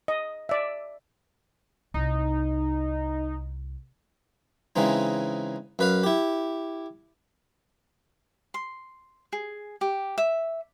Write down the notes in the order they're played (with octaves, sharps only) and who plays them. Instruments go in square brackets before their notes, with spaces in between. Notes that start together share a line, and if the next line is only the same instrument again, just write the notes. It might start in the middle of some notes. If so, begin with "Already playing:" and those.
[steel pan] D#5
D5 E5
[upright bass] C2 [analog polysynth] D#4
[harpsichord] C#3 E3 G#3 C4 D#4
F#2 B4 F5
E4 G4
[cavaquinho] C6
G#4
G4
E5